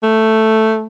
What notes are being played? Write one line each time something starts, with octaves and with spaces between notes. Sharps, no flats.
A3